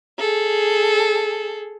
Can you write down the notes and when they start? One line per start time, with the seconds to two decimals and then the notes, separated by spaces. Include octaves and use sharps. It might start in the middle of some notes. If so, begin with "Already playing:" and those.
0.19 G#4 A4